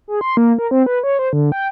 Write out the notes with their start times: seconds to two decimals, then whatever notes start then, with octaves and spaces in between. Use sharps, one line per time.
0.08 G#4
0.21 C6
0.37 A#3
0.58 A#4
0.71 C4
0.86 B4
1.03 C#5
1.19 C5
1.33 D3
1.52 G5